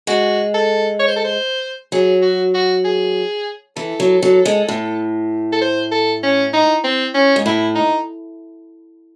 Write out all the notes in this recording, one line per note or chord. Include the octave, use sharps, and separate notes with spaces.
G#3 F#4
A4
C#5
C5
A4
C5
F#3 G#4
F#4
F#4
G#4
E3 A4
F#3
F#3
G#3
A2
A4
C5
A4
C#4
D#4
C4
C#4
G#2
A2 E4
D#4